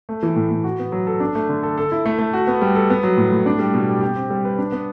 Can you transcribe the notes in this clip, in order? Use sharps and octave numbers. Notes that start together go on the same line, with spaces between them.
A3
E3
A2
A2
F#4
B3
F#3
A4
D4
A3
D3
A4
A4
E4
A3
A3
F#4
B3
G3
A4
B3
F#3
A2
A2
D4
G3
B2
G4
G4
C4
G3
B4
D4
B3